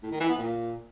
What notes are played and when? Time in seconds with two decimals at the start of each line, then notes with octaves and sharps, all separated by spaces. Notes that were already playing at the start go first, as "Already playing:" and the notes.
0.03 A2
0.11 D#3
0.20 E3
0.29 B3
0.38 A#2